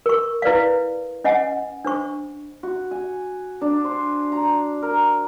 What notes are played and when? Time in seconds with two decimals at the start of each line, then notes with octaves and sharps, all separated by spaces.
0.06 A#4 C#6
0.42 E4 B4 D5 F5
1.24 C#4 D#5 F#5 G#5
1.85 D4 C5 C#6
2.63 F#4
2.91 G#5
3.62 D4
3.85 C5
4.32 A#5
4.82 A#4